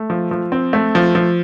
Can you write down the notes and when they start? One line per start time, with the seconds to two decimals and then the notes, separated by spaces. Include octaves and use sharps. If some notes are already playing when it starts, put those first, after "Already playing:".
Already playing: A3
0.10 F3
0.31 F3
0.52 C4
0.73 A3
0.95 F3
1.15 F3